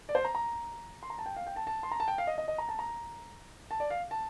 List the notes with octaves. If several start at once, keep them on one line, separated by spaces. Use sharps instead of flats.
D5
C5
A#5
A#5
C6
A#5
A5
G5
F5
G5
A5
A5
C6
A#5
A5
G5
F5
D#5
D#5
D#5
A#5
A5
A#5
A5
D5
F5
A5